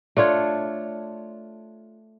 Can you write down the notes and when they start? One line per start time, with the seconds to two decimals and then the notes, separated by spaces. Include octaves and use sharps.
0.17 A3 D4 F4 C#5